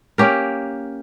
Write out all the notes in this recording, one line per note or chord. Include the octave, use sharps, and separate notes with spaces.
A#3 C#4 G4 A#4